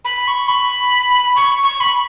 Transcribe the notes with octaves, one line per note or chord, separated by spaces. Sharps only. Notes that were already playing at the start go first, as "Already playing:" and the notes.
B5
C#6
B5
C#6
C#6
B5